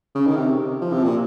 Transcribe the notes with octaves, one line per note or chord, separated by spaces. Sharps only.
C#3
D#3
C3
F3
C3
A#2